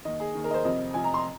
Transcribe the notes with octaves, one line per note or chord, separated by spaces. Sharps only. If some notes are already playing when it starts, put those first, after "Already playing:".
D#2 D#3 D#5
G#4
D#2 D#3
A#4
D#5
C5
F2 C3 F3 D#5
F2 C3 F3 G#5
A#5
C6